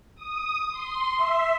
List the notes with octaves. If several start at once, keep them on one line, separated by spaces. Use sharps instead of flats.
D#6
C6
E5